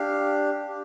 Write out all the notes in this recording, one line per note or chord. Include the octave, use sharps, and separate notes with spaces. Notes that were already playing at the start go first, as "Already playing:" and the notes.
Already playing: D4 G4 F5
D4 G4